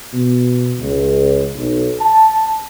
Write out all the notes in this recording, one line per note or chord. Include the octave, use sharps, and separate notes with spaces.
B2
C#2
B1
A5